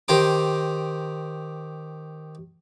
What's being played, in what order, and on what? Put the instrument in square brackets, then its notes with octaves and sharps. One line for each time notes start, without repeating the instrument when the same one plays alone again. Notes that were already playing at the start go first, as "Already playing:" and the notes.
[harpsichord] D#3 G4 C5 A#5 D6